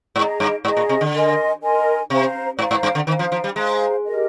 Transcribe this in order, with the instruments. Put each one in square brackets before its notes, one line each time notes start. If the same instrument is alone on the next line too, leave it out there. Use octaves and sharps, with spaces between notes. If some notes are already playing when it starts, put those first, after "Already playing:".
[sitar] G#2 [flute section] G#4 D#5 A#5
[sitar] G2
[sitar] G#2 [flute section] G#4 D#5 A#5
[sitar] A#2
C3
D3
[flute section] A#4 D#5 G#5 C6
A#4 D#5 G#5 C6
[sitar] C3 [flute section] C5 F5 A#5
[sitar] G#2 [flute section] C5 F5 A#5
[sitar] G#2
G2
D3
[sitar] D#3 [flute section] C5 F5 A#5
[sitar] F3
F3
G3
[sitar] G#3 [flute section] C5 F5 A#5
[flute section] G4 A#4 D#5